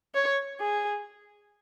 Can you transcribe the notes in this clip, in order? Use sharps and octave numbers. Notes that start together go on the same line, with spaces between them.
C#5
G#4